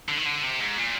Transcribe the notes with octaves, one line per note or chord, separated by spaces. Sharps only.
D3
D#3
D3
C3
G#2
A#2